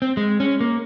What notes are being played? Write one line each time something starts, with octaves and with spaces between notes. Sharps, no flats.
C4
G#3
C#4
A#3